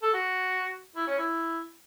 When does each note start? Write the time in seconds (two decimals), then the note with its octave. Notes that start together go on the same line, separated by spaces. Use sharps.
0.02 A4
0.13 F#4
0.96 E4
1.07 C#4
1.18 E4